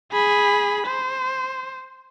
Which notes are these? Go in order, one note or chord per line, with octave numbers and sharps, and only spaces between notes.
G#4 B5
C5